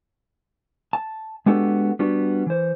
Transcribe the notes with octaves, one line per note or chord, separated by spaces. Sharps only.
A5
G#3 B3 D4 F#4 G4 A4
G3 B3 D4 F#4
E3 C5